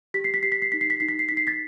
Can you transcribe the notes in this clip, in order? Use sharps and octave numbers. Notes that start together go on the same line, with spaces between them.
G4 B6
C7
B6
G4 C7
B6
C7
D#4 B6
C7
B6
D#4 C7
B6
C7
D#4 B6
C7
A6 B6